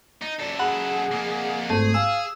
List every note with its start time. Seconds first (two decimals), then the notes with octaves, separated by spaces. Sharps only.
0.22 D#4
0.40 F#2 A4 D5
0.59 G#4 F#5 B5
1.11 F2 A#3
1.70 G#1 A3 G#4 C5
1.94 F5 G#5 E6